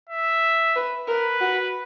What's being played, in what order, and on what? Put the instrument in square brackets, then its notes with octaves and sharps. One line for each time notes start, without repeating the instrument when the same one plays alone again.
[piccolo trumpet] E5
[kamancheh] B4
[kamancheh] A#4 [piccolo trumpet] B4
[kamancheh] F#4